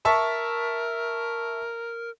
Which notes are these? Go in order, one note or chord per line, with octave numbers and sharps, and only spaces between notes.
A#4 E5 A5 C#6